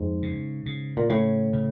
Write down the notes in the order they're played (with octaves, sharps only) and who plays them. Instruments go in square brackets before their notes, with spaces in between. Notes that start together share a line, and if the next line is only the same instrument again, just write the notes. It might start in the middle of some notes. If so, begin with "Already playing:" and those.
Already playing: [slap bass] F2 [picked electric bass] G#2
[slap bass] C#3
C#3
[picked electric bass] A#2
[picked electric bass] A2 [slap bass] C#3
[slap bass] C#3